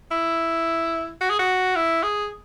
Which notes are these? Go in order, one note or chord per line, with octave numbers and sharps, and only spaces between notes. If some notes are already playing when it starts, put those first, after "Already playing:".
E4
F#4
G#4
F#4
E4
G#4